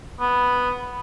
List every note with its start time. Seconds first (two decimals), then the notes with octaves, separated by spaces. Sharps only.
0.20 B3